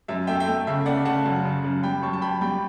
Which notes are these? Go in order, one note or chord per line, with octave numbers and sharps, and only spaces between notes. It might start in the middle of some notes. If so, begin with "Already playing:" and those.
F#2 E5
A3 E5 G5
E5 G5
A3
C#3 E5
A3 D5 F#5
C#3 F#5 A5
F#2
C#3
F#2
G3 G5 B5
F#2 A5 C#6
A5
F#2 G5 B5
G3 G5 B5